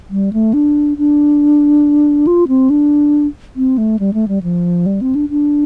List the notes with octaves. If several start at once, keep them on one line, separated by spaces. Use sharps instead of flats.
G3
A3
D4
D4
F4
C4
D4
C4
A3
G3
A3
G3
F3
G3
C4
D4
D4